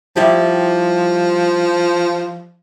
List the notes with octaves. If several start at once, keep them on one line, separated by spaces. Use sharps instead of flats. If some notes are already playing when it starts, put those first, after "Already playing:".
F3 G3 E4 G4